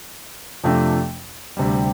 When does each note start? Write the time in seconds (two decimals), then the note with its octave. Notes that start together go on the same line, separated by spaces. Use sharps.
0.64 F2 C3 F3 A3 D4
1.57 D2 C3 G3